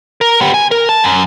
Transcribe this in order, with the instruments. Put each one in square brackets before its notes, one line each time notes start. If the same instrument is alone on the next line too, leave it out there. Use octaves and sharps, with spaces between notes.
[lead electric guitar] A#4
B3 G4
G#5
A#4
A5
F#2